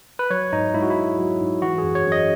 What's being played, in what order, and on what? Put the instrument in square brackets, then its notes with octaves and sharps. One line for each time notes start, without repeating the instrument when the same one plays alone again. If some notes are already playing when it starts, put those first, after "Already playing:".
[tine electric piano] B4
F#3 C#5
G#2 D#4
G#2 E4
F#4
E4
F#3
F#3
G#2
E3 F#4
G#4
F#2
C#5
F#2
D#5